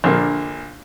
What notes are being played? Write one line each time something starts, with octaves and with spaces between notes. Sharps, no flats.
A#1 D3 A#3